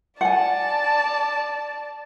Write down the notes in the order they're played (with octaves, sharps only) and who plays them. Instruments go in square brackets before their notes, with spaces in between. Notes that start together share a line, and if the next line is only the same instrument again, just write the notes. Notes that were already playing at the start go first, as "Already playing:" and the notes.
[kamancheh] D5 A5 [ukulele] F#5 G#5